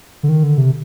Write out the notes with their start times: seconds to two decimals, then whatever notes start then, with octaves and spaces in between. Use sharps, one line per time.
0.23 D3
0.29 D#3
0.43 D3
0.58 C3